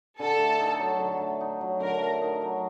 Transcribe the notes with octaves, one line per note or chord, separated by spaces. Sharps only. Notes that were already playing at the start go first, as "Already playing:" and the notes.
D3 A4
A3
D#4
F#3
D3
A3
D#4
F#3
D3 A#4
A3
D#4
F#3